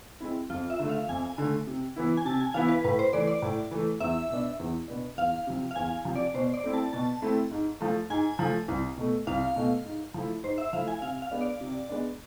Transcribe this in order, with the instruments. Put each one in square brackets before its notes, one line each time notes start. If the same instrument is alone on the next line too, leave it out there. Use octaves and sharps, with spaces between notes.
[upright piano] G#3 C4 E4
[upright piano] F2 [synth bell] F4
[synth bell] E5
[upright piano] D3 A3
[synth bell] F5
[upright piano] F2 [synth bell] G#5
[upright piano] D3 A3
C3
E3 B3 E4
[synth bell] G#5
[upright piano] C3 [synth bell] A5
[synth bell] G#5
[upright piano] E3 B3 E4 [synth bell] F5
[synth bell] B4
[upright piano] A2 [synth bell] B4
[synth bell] C5
[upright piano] E3 A3 [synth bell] D5
[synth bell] D5
[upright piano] A2
E3 A3
[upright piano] E2 [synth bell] E5
[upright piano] B2 B3 D4
E2
B2 B3 D4
[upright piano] E2 [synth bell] F5
[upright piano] C3 F3
[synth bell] F5
[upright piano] E2 [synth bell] G#5
[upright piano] C3 F3
[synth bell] D5
[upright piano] B2 [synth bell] C5
[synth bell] D5
[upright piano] A3 C4 E4
[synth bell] A5
[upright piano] B2 [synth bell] A5
[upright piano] A3 C4 E4
G#2
F3 A3
[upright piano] G#2 [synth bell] G#5
[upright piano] F3 A3
C2
B2 A3
[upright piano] C2 [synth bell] F5
[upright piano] B2 A3
G#2
F3 A3 E4
[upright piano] G#2 [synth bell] C5
[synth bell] E5
[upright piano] F3 A3 E4 [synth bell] F5
[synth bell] G#5
[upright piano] C3 [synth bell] F5
[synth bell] F5
[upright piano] G#3 B3 D4
[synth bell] D5
[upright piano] C3
G#3 B3 D4